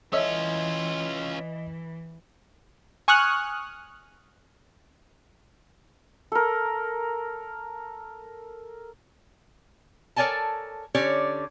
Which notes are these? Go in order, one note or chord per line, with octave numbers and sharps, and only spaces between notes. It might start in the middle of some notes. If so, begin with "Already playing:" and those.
E3 C#4 F4 A4 C#5 D#5 E5
G#5 C#6 D#6 F6 F#6
A4 A#4
A4 A#4 C#5 D5 G#5 A5
D3 C#4 G4 C#5 D5